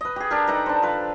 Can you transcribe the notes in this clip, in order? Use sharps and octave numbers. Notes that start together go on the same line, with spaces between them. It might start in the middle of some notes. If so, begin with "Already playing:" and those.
B4 D#5
G4 G#4
D4 G4 A#4
D#4 A4 B4 A#5
D4 C5
F3 B4